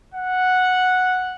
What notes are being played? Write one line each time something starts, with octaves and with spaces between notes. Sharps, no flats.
F#5